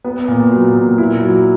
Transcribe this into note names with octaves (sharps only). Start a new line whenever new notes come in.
B3
A#2
F#3
A#2
E4
F#3